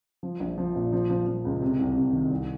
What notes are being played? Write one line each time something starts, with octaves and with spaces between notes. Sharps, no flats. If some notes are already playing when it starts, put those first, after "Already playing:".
F3
A#1
F3
A#2
F3
F3
F3
C#2
C3
C2
C3
D#3
C2